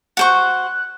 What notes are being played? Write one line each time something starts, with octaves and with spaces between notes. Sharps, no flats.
F#4 C5 C#6 F#6